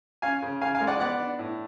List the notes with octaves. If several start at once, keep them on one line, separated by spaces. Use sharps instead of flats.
C#4 F5 G#5
C#3
C#3 F5 G#5
F5 G#5
G#3
D5 F#5
B3 D5 F#5
D4
A2